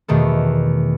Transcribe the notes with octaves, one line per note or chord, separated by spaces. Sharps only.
E2 B2 D#3 A3